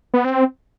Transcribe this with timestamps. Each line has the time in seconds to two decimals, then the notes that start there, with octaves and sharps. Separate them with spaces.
0.14 B3
0.25 C4